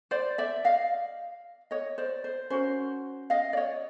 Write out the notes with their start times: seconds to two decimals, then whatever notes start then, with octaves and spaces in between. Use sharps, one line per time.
0.11 C5 D5
0.38 D5 E5
0.64 D#5 F5
1.71 C#5 D#5
1.98 C5 D5
2.24 C5
2.50 C#4 F#4 A#4 C5
3.30 D#5 F5
3.53 D5
3.57 C#5 D#5